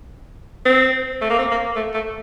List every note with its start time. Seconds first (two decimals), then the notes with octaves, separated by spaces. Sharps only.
0.65 C4
1.21 A3
1.30 A#3
1.39 C4
1.51 A#3
1.75 A3
1.94 A3